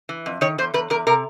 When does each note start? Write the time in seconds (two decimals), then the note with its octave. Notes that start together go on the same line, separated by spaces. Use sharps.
0.09 E3
0.26 F2
0.41 D#3 C#5
0.58 E2 C5
0.74 E2 B4
0.90 E2 A#4
1.07 C3 A#4